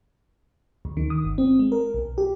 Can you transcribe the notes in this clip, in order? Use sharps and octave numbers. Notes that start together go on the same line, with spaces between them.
D2
D#3
D#6
G1
C4
G#3
A#4
B1
G4